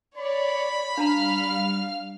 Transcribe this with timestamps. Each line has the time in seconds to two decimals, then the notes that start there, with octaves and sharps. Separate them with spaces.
0.18 C#5 D5 B5
0.98 G3 D4 F5 A5 A#5 F6